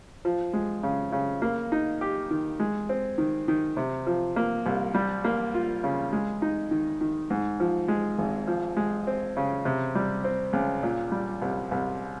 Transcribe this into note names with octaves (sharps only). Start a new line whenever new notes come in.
F3
G#3
C#3
C#3
A#3
D#4
G4
D#3
G#3
C4
D#3
D#3
C3
F3
A#3
C2
G3
A#3
F4
C#3
G#3
D#4
D#3
D#3
G#2
F3
G#3
G#1
F3
G#3
C4
C#3
C3
G3
C4
C#2
A#2
G3
C2
C2